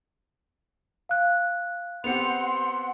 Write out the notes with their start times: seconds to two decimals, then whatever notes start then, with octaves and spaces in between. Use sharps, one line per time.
1.09 F5 F#6
2.04 B3 C4 G4 F#5 C6 C#7 F7